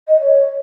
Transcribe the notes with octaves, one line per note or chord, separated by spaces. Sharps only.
D#5
C#5